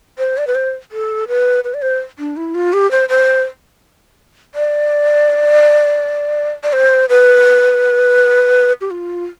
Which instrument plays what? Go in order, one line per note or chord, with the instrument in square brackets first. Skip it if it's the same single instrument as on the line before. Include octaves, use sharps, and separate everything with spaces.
[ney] C5
D5
B4
C5
A4
B4
B4
D5
C5
D4
E4
F4
G4
C5
C5
D5
D5
C5
B4
G4
F4